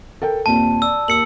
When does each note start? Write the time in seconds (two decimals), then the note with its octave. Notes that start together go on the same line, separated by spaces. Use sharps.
0.22 A4 A#4 G5
0.46 D#2 A#2 C4 A5
0.82 D5 E6
1.08 D#2 A#4 E6 C#7 F#7